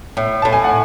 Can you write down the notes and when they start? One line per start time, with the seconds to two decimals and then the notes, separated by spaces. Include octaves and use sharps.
0.17 A2
0.42 A2 A5
0.53 G#5
0.64 F#5